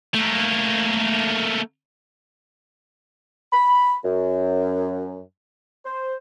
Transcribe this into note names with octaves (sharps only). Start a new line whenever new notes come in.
A3 A#3
B5
F#2
C5